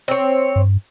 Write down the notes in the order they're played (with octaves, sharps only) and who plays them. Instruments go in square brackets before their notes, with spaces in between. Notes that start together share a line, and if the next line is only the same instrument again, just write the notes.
[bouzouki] C4 C#5
[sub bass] G2